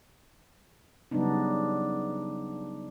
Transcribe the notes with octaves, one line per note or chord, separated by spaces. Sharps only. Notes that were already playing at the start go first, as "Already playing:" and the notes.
C#3 F#3 G3 B3 D4 D#4